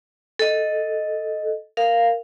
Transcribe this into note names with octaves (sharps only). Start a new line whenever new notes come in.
A4 D#5
A#4 F5